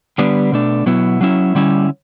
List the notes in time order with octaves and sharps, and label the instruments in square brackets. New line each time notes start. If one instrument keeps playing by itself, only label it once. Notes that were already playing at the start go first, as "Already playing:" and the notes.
[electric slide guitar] D3 G3 B3 D4
B2 A3 D4
B2 F#3 B3 E4
F#3 C#4 E4
D3 G3 C#4 E4